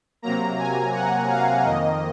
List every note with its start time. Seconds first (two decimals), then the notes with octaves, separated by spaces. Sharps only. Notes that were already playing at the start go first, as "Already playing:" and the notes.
0.22 C3 F#3 A#3 A#5
0.59 G#5
0.94 F#5
1.29 F5
1.65 F2 D#3 A#3 D#5